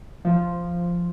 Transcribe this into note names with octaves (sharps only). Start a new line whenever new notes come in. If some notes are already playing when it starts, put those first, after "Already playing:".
F3